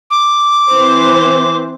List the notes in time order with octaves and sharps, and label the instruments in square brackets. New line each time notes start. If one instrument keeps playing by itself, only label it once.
[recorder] D6
[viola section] E3 C4 C5